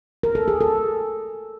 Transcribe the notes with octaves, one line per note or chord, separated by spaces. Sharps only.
A#4
A4
G#4
A4